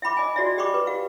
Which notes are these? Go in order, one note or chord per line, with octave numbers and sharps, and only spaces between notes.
E5 G5 B5 D6
D#5 G#5
F#4 D5 E5
G4 D#5 G5 B5 C#6 D6
B4
G4 F5